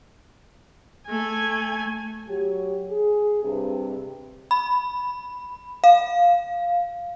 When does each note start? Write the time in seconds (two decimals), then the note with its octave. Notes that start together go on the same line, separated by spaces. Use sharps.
1.08 A3 G#5
2.28 F#3 G4
2.89 G#4
3.43 G2 C3
4.51 B5
5.84 F5